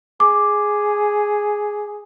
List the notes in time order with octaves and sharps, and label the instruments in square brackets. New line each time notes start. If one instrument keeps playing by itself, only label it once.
[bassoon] G#4 [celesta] D6